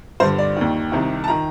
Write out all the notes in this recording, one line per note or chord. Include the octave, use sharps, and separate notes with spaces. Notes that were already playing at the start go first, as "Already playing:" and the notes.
G2 D3 C5
D5
D#2 D#3
C2 C3 D#3
A5
D#3 A#5